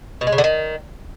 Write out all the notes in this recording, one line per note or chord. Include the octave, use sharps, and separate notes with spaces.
B2
G#3
C#3
D3
D#3